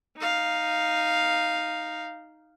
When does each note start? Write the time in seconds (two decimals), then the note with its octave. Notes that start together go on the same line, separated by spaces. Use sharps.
0.17 D#4 F5